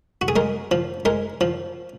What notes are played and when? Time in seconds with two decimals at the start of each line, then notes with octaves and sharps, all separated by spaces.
0.21 F#4
0.28 G#4
0.36 G#3 A#4
0.71 F3
1.05 G#3 A#4
1.41 F3